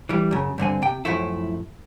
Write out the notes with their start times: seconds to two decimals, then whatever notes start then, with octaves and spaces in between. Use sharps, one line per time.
0.09 E3 G3
0.31 F#2 C#3
0.58 G2 D3 C4 G#5
0.82 C3 G5
1.05 F#2 A2 F3 A3 E4